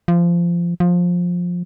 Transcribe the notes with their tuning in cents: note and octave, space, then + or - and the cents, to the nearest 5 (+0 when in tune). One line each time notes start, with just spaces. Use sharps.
F3 -20
F3 +15